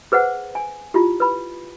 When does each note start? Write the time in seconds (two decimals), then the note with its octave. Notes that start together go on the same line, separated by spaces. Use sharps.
0.12 G#4 B4 C5 F#5
0.55 G#5
0.94 E4 F4 G4
1.20 B4 B5